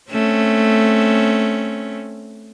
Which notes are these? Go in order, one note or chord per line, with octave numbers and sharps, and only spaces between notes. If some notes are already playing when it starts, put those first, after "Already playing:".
A3 C4 C#4